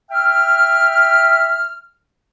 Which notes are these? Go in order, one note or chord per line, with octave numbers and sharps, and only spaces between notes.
E5 G5 F6